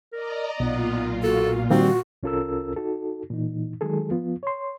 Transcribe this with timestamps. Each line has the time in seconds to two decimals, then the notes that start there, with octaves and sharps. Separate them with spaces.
0.13 A#4 D5 D#5 A#5
0.60 B1 A#2 B3 F4
1.23 F#4 A4
1.70 D#3 F3 G3 C4 F#4
2.23 C2 C#4 F4 A4 A#4 E6
2.76 D#4 F#4 A4
3.30 A#2 E3 D#4
3.81 D#3 F#3 G#3 G#4 A4
4.11 F3 B3 F4
4.43 C#5 C6